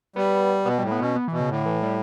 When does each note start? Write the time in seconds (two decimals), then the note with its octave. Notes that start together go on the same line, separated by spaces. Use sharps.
0.16 G3 B3
0.65 B2 B3
0.78 G3
0.82 A2
0.91 B3
0.99 B2 C#4
1.16 B3
1.28 E3
1.32 B2
1.40 C#3
1.48 A2 D3
1.66 E3
1.83 G3